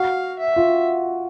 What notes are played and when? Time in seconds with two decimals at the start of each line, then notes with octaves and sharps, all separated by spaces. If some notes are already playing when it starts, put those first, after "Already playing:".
Already playing: F#4 F5
0.39 E5
0.56 F4